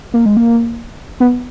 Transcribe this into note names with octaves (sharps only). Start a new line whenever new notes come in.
A#3
G#3
A#3
B3